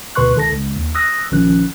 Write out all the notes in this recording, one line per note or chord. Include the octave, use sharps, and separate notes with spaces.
D2 B2 B4 C6 C#6 F#6
C#2 D#3 A4 A5 A#6
C#2
D#2
D#6 E6 F#6 A#6
A#1 D#3 F3 C#4 F#6